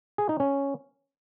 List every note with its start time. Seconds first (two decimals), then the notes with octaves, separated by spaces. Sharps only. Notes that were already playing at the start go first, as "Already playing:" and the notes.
0.18 G#4
0.29 D#4
0.40 C#4